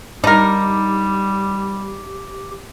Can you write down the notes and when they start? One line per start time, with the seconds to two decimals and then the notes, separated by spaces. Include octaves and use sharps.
0.24 G3 D4 D#4 G4 A#4